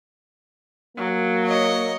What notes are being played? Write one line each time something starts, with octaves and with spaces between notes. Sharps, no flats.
F#3 A#3
C#5 D#5